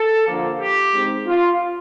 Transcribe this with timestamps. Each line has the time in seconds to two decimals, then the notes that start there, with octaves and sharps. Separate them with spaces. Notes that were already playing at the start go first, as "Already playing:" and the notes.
Already playing: A4
0.27 D3 F3 A#3
0.59 G4
0.92 D#3 G#3 C4
1.26 F4